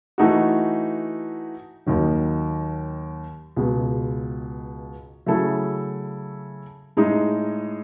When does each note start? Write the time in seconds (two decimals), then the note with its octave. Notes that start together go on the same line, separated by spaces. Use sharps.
0.18 E3 A3 D#4 F#4
1.86 D#2 D#3 F#3
3.57 C#2 B2 G#3
5.26 C#3 F#3 A3 E4 A4
6.97 A2 G#3 D#4